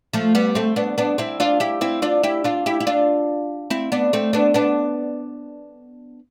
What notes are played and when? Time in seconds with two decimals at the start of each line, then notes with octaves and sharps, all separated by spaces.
0.13 F3 A3
0.35 G3 B3
0.55 A3 C4
0.76 B3 D4
0.98 B3 D4
1.18 C4 E4
1.40 D4 F4
1.60 E4 G4
1.81 C4 E4
2.02 D4 F4
2.23 E4 G4
2.44 D4 F4
2.66 E4 G4
2.80 E4
2.87 D4 F4
3.70 C4 E4
3.92 B3 D4
4.13 A3 C4
4.33 B3 D4
4.54 B3 D4